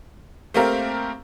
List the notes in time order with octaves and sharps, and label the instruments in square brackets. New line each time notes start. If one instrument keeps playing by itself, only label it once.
[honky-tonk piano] A3 A#3 C4 G4 A#4 F5